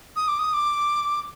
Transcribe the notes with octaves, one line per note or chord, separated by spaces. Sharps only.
D#6
D6
D#6
D6